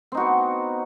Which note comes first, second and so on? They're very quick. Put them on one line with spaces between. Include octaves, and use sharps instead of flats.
C4 D#4 F#4 B3